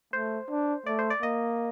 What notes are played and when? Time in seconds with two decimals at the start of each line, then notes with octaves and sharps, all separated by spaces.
0.13 A3 C5
0.50 D4
0.86 A3 D5
0.99 C5
1.10 D5
1.23 A#3 D#5